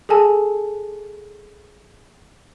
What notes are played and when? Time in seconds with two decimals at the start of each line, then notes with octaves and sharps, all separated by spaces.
0.09 G#4 A4 G#5 A5